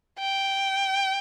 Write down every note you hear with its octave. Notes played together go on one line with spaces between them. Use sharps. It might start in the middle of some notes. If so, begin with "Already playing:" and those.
G5